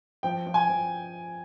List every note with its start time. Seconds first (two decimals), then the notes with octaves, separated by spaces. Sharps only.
0.23 F3 G5
0.47 F3
0.54 G#5
0.69 F3